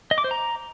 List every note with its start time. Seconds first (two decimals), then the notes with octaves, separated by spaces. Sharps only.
0.11 D#5
0.18 D6
0.24 C5
0.31 A#5